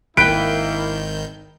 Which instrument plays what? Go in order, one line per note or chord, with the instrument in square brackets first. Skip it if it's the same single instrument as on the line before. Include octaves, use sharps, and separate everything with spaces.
[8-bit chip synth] G#1 D#3 G6 [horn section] A#3 E4 [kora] B4 G5 [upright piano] D7